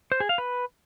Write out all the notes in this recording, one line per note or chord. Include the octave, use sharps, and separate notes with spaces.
C5
G#4
F5
B4